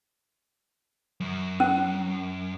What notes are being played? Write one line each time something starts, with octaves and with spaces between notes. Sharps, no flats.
F#2
C#4